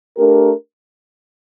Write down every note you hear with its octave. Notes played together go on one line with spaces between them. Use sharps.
A3 D4 G4 A#4